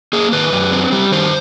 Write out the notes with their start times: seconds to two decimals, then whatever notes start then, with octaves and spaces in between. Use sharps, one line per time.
0.13 A#3 G#4
0.32 D#3 B4
0.52 F#2
0.72 C4
0.92 G3
1.12 D#3 C5